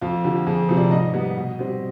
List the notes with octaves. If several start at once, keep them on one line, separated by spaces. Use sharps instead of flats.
F2 F4
D3 F3 G4
F2 G#4
C3 F3 C4
D5
G#2 D#5
G3 B3
B2
G3 C4